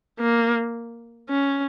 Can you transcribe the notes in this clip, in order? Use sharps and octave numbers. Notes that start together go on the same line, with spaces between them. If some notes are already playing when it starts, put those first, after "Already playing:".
A#3
C#4